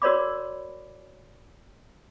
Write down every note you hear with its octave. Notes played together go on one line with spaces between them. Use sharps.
F#4 A#4 C#5 D5 B5 D6